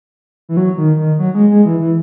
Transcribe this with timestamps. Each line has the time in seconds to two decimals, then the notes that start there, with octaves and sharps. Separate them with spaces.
0.49 E3
0.57 F#3
0.78 D#3
0.98 D#3
1.19 F#3
1.34 G#3
1.50 G#3
1.65 E3
1.81 E3